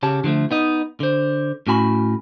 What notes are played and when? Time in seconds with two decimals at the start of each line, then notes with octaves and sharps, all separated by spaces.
0.03 C#3 G4 C#5 A5
0.24 D3 F3 G#3 A3
0.51 B3 D#4 D#5
1.00 D3 C5
1.67 A2 C#4 F#4 G#5 A#5 B5